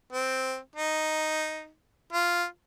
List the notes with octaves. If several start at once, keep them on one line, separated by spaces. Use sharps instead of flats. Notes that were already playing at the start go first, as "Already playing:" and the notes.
C4
D#4
F4